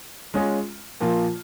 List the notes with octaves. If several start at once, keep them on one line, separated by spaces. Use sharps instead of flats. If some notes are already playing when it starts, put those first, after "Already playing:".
G#3 C#4 F4 G#4
A#2 F3 A#3 F4